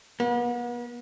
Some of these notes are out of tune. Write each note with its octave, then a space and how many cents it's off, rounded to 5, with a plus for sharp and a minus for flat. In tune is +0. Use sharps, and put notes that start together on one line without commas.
B3 -40